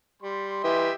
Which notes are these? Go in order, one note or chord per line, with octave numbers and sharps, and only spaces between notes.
G3 C6
E3 G4 D#5 E5